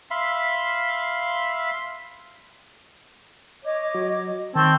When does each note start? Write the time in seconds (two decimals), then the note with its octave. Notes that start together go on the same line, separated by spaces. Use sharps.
0.11 E5 F5 B5 C6
3.64 C#5 D#5 D6
3.94 F#3
4.55 D#3 C4 G5 A5 C#6